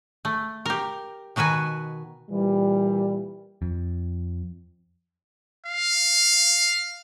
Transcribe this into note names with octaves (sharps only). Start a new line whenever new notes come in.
A3
G4 A#4
B2 D#3 F#4 B4 G#5
A#2 E3 G3
F2
F5